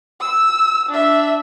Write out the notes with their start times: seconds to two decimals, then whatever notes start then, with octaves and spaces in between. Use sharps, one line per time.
0.21 E6
0.89 D4 E5